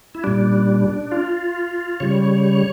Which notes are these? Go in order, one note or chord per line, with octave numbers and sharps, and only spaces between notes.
E4
A#2 G3 D4
F4
C#3 G3 C#5